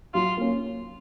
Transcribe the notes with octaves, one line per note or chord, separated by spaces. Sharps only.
F#3 F4
A#3 C#4